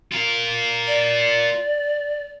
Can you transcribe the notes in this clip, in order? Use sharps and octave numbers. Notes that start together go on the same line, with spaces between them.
F4 A#4
D5